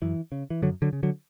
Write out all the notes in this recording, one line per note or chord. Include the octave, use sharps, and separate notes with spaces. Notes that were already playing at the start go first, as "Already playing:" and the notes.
F#2 E3
C#3
E3
F#2 D3 F#3
D3 F#3
C#3
D3 F#3